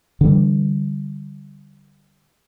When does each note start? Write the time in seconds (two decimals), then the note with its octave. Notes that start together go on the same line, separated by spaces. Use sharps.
0.21 D3 E3 G3